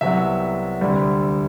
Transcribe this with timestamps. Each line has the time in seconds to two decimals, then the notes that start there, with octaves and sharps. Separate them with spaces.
0.01 C2 C3 F#3 B3 E5
0.81 D2 C3 G3